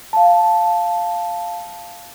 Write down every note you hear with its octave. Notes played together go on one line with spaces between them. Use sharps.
F5 A5